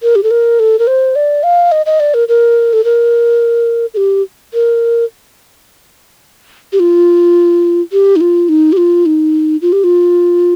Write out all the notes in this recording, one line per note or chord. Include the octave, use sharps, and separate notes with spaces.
A#4
G4
A4
A#4
A4
A#4
C5
D5
F5
D#5
D#5
D5
A#4
A#4
A4
A#4
A4
G4
A#4
G4
F4
G4
D#4
F4
D#4
G4
F4
D#4
F4
G4
F4